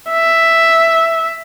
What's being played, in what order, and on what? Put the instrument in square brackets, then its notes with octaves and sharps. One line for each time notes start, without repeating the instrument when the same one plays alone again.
[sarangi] E5